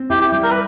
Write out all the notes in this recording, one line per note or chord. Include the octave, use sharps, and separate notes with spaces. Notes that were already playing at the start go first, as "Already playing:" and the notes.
Already playing: C4
E4 G4
G4
G3 G4
A#4
B4